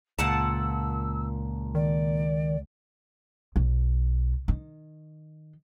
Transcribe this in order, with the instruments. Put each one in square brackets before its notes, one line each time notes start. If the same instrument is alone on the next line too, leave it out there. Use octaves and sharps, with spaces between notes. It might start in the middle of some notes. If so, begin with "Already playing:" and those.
[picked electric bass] C#2 [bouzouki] A#2 F#5 A5 [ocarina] E6
[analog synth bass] D#3 [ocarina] D5
[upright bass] B1
D#3